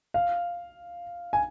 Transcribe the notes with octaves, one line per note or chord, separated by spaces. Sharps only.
F5
G#5